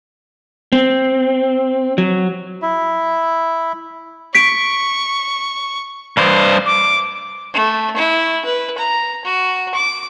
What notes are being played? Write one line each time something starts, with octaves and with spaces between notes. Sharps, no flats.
C4
F#3
E4 E5
C#6 B6 D7
G2 C5
D6
A3
E4
B4
A#5
F#4
D6